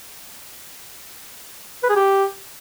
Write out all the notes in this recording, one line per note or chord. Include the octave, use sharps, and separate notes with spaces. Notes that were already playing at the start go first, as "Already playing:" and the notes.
B4
G#4
G4